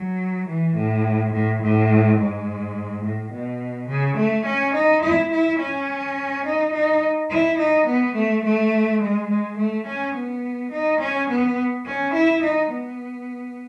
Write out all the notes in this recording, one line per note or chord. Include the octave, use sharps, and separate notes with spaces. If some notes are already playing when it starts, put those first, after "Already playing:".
Already playing: F#3
E3
A2
A2
A2
G#2
A2
B2
C#3
A3
C#4
D#4
E4
E4
C#4
D#4
D#4
E4
D#4
B3
A3
A3
G#3
G#3
A3
C#4
B3
D#4
C#4
B3
C#4
E4
D#4
B3